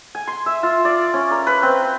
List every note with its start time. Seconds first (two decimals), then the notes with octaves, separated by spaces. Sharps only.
0.15 G#5
0.28 C6
0.46 E5
0.63 F4
0.85 D5
1.14 C#4
1.31 A#4
1.47 B4
1.63 C4